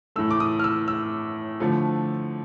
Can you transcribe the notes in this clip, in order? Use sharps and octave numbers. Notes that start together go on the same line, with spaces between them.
A2 E3 A3 E6
D6
D#6
F6
E6
E6
D3 F3 A3